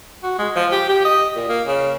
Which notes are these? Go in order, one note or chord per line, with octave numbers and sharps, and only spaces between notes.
F#4
G#3
F3
G4
G4
D#5
A#2
A#3
C#3